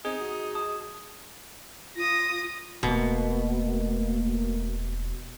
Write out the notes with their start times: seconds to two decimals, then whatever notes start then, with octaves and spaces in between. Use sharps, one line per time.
0.05 C4 D#4 G#4 G#6
0.20 F#4
0.55 A5 D#6
1.96 F4 D#6 A#6
2.83 E1 B2 A3 A#3